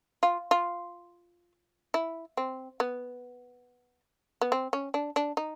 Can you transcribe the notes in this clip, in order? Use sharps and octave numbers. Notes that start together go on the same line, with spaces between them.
F4
F4
E4
C4
B3
B3
C4
C#4
D4
D4
D#4